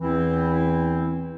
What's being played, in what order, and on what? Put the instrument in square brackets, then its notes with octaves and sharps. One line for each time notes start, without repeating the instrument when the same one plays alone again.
[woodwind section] E2 E3 C4 E4